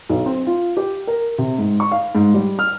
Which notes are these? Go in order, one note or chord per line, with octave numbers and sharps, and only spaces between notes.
B1
C4
F4
G4
A#4
C3
G#2
C#6
F5
G#2
G3
F6